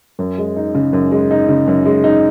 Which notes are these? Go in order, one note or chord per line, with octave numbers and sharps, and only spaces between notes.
F#2
G#3
D#4
C#3
F#2
G#3
D#4
C#3
F#2
G#3
D#4